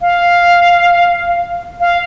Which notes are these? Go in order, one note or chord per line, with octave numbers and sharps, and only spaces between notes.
F5
F5